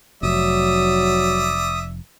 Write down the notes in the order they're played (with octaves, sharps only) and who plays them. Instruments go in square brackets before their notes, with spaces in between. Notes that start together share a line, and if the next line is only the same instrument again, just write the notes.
[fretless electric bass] F1 [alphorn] F#3 [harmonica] D5 E5 [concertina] D#6